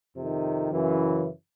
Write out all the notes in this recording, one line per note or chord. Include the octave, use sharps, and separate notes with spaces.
F2 C3 D#3
F#2 C#3 E3